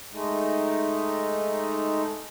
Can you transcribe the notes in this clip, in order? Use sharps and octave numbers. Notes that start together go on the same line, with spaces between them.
G#3 A3 D#4